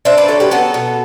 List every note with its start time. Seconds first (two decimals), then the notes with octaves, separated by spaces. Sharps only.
0.05 D4 C5 E5
0.18 B4 D5
0.28 F#3 A4 C5
0.40 G4 B4
0.51 B3 F#4 A4
0.74 B2